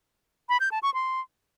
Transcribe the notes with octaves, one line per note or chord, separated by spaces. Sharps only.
B5
G6
A5
C#6
C6